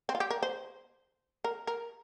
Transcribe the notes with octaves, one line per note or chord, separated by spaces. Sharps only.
C4
F4
G4
A#4
C5
A#4
A#4